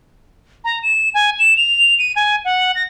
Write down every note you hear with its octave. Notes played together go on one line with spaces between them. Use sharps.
A#5
E7
G#5
E7
F7
D#7
G#5
F#5
A#6